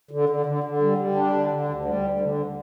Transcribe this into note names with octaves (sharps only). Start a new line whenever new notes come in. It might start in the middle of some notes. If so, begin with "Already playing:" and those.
D3
D3
D3
D3
G3
G3
D4
D3
D3
D2
G3
D2
D3